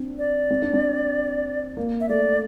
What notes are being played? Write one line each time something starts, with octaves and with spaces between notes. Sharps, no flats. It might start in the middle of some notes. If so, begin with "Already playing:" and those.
Already playing: C4 D4
D5
C4
D4
C4
A#3
E5
A3 D5